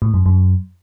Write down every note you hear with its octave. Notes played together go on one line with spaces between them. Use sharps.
A2
F#2
F#2